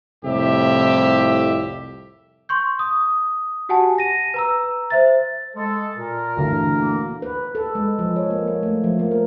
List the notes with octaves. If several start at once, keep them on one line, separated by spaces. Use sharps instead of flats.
C2 F2 A2 G4 E5
C6 C#6 G6
D#6
F#4 G4 F#5 G#5 A5
A#6 D#7
B4 A#5 E6
C5 E5 A6
G#3 A4
A#2 A#4
D2 G2 A#2 D3 E3
A#3
B4
A4
G#3
F3
C#5
A#3
C#5
A3
F3
A#3
A#4